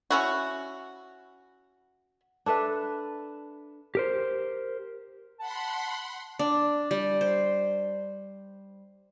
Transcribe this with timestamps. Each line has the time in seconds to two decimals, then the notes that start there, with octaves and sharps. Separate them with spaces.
0.10 C#4 E4 F#4
2.46 D4 A4 B4 E5
3.95 G4 A#4 C5
5.39 F#5 A5 B5 C6
6.39 D4
6.91 G3
7.21 C5